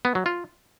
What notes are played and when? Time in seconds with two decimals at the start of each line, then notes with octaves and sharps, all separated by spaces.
0.05 B3
0.15 F#3
0.26 F4